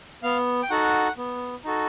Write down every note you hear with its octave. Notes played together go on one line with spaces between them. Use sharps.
B3 F5
G5
D#4 F#4 A4 F#5
B3
D#4 F#4 A4